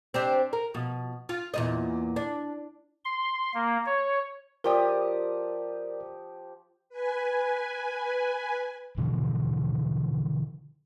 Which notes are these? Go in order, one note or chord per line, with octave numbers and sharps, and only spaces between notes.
C4 D4 G4
A#4
B2 F3
F4
E2 A#2 D#5
D4
C6
A#3
C#5
F3 G4 A#4 D5 D#6
B4 G#5
B2 D3 E3 F3